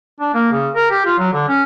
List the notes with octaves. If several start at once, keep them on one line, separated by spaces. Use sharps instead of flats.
D4
A#3
C#3
A#4
G4
F4
F#3
D3
C#4